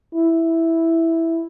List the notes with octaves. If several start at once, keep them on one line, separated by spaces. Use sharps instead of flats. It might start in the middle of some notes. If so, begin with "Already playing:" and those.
E4